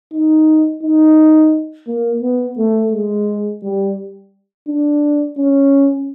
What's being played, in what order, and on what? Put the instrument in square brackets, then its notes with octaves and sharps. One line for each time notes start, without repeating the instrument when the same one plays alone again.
[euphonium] D#4
D#4
A#3
B3
A3
G#3
G3
D4
C#4